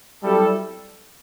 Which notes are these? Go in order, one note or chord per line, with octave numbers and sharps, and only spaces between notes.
F#3 G3 C4 E4 A4